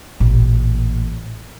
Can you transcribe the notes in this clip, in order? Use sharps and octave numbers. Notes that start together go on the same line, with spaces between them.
A1 A#2